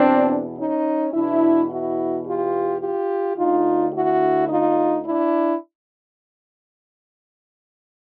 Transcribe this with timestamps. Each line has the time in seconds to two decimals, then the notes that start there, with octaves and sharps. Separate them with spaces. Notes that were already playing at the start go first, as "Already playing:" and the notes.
Already playing: E2 B2 C4 D4
0.58 C#4 D#4
1.13 E2 B2 D4 E4
1.69 E4 F#4
2.25 F4 G4
2.81 F4 G4
3.37 D2 D3 D#4 F4
3.93 E4 F#4
4.48 D#4 F4
5.04 D4 E4